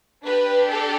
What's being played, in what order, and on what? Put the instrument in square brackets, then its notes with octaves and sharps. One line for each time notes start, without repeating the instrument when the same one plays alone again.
[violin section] D4 G4 B4
A4